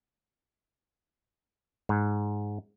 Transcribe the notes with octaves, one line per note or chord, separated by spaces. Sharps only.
G#2